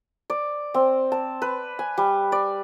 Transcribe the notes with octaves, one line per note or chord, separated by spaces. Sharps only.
D5
C4
A5
B4
G#5
G3
D5